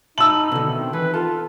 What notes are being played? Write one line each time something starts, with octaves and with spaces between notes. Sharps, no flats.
D#4 E5 A5 B5 E6 F#7
B2 D3 D#3
C4 D#4
E3 B4
F4 A4 A5